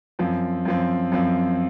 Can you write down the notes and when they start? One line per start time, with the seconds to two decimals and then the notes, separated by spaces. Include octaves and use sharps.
0.19 F#2 F3 C4
0.65 F#2 F3 C4
1.12 F#2 F3 C4